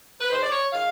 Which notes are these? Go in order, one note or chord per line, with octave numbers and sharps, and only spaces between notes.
B4
D#3 G#3 C5
D5
C#5
D#3 G#3 F5